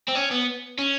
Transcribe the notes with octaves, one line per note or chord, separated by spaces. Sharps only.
C4
C#4
B3
C#4